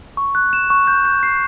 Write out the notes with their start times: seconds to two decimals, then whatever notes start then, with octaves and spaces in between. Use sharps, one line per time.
0.17 C#6
0.35 F#6
0.53 E7
0.70 C#6
0.87 G6
1.05 G6
1.23 C7